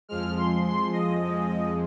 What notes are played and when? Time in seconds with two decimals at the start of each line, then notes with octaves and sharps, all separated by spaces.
0.09 F2 F3 G#3 F6
0.37 C6
0.65 C6
0.93 D#5
1.21 F2 F3 G#3